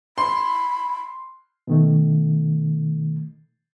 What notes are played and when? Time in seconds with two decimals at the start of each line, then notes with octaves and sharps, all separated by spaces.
0.18 B5 C6
1.67 B2 D#3 A3